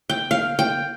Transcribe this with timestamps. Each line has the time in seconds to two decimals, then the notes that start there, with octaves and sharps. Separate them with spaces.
0.09 G5
0.31 F5
0.59 G5